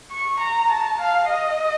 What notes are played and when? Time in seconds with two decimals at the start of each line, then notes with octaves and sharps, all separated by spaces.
0.11 C#6
0.40 A#5
0.71 A5
1.01 F5
1.30 D#5